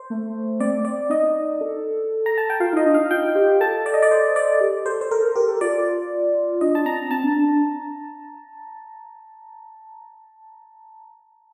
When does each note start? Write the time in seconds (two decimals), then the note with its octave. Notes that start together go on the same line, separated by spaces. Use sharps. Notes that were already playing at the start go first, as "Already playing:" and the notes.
Already playing: C5
0.10 A3
0.60 C4 D5
0.85 D5
1.10 D#4 D#5
1.61 A4
2.26 A#5
2.38 A5
2.50 G5
2.60 F4 F5
2.73 D#4 D#5
2.85 D4
2.94 F5
2.98 D#4
3.11 F4 G5
3.24 F4
3.35 G4
3.60 A4 A5
3.86 D5
3.94 D#5
4.02 D5
4.11 C5
4.36 D5
4.61 G4
4.86 A4 C5
5.01 C5
5.11 A4 A#4
5.24 A#4
5.35 G4 A#4
5.48 A4
5.61 F4 D5
6.61 D4 D#5
6.75 A5
6.85 C4 A#5
7.10 C4 A5
7.24 D4
7.36 D4
7.48 D4